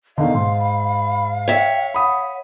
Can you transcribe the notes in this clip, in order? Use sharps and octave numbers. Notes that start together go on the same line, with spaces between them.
E2 D3 D#3 D#5 F5
G#2 C6
B5
C#5 E5 G5
F#5 B5 D#6